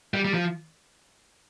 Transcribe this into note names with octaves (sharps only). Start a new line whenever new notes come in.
G3
G3
F3